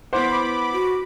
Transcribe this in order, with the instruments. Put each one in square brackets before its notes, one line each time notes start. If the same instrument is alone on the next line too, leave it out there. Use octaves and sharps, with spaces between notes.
[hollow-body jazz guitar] B3 E4 F#5 [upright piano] C5 [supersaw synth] B5 D6
[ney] F#4